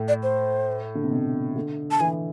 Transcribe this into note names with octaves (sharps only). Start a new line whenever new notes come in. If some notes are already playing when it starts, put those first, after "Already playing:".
Already playing: A2
D5
C5
D3
C3
B2
D3
A5
E3 G#5